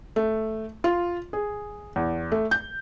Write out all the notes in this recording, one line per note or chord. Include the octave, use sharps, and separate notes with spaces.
A3
F4
G#4
E2
A3
G6